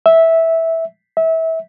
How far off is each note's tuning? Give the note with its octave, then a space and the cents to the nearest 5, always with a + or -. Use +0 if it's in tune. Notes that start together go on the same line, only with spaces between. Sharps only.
E5 -10
E5 -25